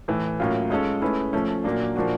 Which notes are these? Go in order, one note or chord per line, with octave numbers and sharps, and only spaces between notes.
A2 E3 A3
A2 F#3 A#3 C#4 F4
G#3 C#4 F4 A4
A3 C#4 E4 G#4 B4
F3 A3 C#4
A#2 F#3 A#3 D4
A#2 F3 A#3 D4 F#4